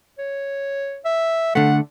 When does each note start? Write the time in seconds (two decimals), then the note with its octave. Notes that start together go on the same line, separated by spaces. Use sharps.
0.19 C#5
1.05 E5
1.55 D3 A3 F#5